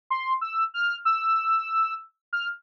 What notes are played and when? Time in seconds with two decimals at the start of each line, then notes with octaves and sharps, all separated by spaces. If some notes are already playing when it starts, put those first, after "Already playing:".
0.10 C6
0.41 E6
0.74 F6
1.05 E6
2.33 F6